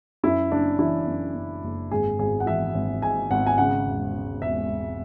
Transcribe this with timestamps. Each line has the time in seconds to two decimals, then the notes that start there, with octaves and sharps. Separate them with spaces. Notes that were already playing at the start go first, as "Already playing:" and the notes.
0.23 F#2 E4
0.51 F#1 D4
0.79 E3 E4
1.07 F#2
1.35 F#2
1.63 F#1
1.91 G#1 G#4
2.19 G#1 G#4
2.40 F#5
2.46 E3 E5
2.74 G#1
3.02 G#2 G#5
3.31 G#1 F#5
3.46 G#5
3.58 C#3 F#5
3.86 E1
4.13 C#3
4.41 E1 E5
4.69 E1